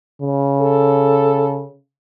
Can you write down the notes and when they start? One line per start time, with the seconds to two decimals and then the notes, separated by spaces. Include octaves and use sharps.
0.21 C#3
0.61 A4